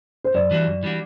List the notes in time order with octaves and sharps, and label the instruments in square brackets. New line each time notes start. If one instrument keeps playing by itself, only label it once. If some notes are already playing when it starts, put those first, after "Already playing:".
[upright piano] C5
[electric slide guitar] F#2 [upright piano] D5
[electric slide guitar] E3 G3 D4 F#4
F#2
E3 G3 D4 F#4